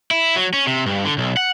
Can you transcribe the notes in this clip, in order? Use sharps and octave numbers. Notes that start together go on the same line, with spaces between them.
E4
F#3
C#4
C3
G2
D3
B1
F#5